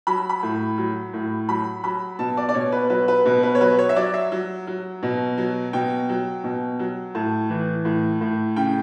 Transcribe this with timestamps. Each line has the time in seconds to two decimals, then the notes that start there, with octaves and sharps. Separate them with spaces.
0.07 F#3 B5
0.29 B5
0.43 A2
0.78 F#3
1.14 A2
1.49 F#3 B5
1.84 F#3 B5
2.19 B2 A5
2.37 D5
2.49 D5
2.54 B2 C#5
2.72 B4
2.90 F#3 B4
3.08 B4
3.26 B2 B4
3.43 B4
3.55 C#5
3.61 F#3 B4
3.79 C#5
3.89 E5
3.96 F#3 D5
4.14 E5
4.32 F#3
4.67 F#3
5.03 B2
5.38 F#3
5.73 B2 G5
6.09 F#3
6.44 B2
6.79 F#3
7.15 A2 A5
7.50 E3
7.85 A2
8.21 A2
8.56 C#3 G5